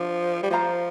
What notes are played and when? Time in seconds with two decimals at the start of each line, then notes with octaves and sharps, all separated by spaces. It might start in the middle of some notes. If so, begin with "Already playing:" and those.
Already playing: F3 D4 F4
0.43 G3
0.50 F3 F4 C5 F5 A#5